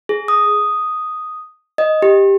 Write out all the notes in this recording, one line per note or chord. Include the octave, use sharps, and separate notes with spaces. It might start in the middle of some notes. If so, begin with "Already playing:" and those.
G#4
D#6
D#5
G4